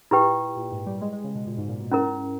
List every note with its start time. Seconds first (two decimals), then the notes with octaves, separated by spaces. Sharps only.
0.11 A#2 E4 G4 B4 G5
0.56 A#2
0.71 G#2
0.86 G3
1.01 G#3
1.13 G#3
1.24 C#3
1.35 B2
1.46 A#2
1.57 G#2
1.69 A#2
1.80 B2
1.91 G#2 C#4 E4 A#4